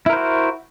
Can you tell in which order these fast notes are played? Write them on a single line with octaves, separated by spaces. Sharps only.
E4 A#4 C5 F#4